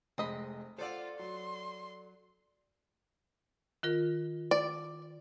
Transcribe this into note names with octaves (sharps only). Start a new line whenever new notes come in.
F1 G#3 C4 D#5 B5
F4 A4 C5 D5 F#5
F#3 C6
D#3 F4 A#4
D5